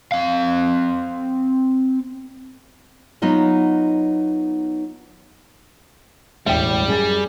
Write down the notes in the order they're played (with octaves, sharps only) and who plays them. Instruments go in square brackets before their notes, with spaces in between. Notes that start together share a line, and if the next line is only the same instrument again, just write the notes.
[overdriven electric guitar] C4 F5
[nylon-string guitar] F#3 B3 D#4 F4 D#5
[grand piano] E1 A1 [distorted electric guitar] G3 [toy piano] E5 G5
[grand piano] F#2 G#5 A6 [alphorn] G#4